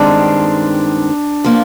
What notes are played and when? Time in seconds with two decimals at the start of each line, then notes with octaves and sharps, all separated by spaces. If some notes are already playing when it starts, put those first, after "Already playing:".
Already playing: G2 D#3 G#3 C4 D4
1.44 F3 A#3